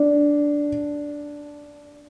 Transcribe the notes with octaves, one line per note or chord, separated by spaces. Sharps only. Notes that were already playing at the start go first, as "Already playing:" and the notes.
Already playing: D4